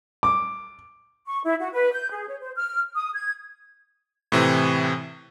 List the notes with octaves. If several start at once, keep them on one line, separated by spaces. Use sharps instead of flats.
D6
C#6
E4
F#4
B4
G6
G#4
C#5
C5
F6
D#6
G#6
A2 C3 E3